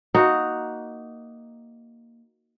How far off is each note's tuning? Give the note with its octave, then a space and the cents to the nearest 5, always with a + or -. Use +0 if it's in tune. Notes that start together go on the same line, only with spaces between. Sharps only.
A#3 +0 D#4 +0 F#4 +0